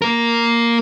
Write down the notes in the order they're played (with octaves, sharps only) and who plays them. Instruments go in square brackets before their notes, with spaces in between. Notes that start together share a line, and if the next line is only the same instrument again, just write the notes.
[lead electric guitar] A#3 A#4